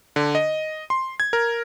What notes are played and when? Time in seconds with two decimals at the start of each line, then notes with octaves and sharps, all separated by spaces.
0.16 D3
0.35 D#5
0.90 C6
1.20 G#6
1.33 A#4